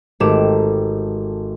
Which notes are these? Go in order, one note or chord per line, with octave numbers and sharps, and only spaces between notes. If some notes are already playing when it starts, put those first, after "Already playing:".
G#1 A3 G4 D6 E7